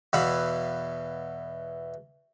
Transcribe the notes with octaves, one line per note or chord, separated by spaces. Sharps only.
E2 B2 E3 F5 B5